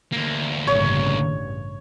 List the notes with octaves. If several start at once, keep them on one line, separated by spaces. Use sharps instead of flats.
D2 A#3
A1 G2 C#3 C#5